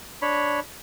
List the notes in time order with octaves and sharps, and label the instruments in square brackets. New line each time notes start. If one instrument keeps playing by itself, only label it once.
[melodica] D4 C#5 B5